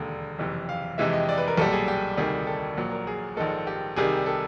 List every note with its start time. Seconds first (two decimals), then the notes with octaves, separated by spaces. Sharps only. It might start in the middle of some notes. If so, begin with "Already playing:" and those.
Already playing: E1 D#2 D3
0.39 F#1 F2 C3 E3
0.69 F5
0.98 F2 C3 E3 G#3 E5
1.13 D#5
1.29 D5
1.38 B4
1.48 A#4
1.57 B1 A#2 G3 A4
1.73 G#4
1.88 G4
2.17 D2 C3 D#3 G3 G#4
2.47 A4
2.77 A#1 A#2 F#3
2.92 A#4
3.07 G#4
3.36 A#1 G#2 D#3 G#3 A4
3.67 G4
3.96 C2 C3 D#3 G3 G#4
4.26 A4